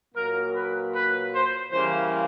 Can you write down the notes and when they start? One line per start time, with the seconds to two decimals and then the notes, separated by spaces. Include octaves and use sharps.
0.15 A#2 F#3 A#3 A#4
0.55 B4
0.94 B4
1.33 C5
1.72 C#3 E3 G3 A#3 C5